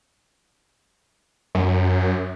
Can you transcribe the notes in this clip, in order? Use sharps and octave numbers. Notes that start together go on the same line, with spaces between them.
F#2